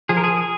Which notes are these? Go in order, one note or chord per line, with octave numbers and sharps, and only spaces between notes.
F3 G#4
A#4
G#4